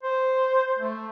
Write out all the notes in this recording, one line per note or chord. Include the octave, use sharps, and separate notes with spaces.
C5
A3